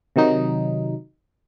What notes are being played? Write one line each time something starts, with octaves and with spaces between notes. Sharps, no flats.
C3 D#3 F#3 D#4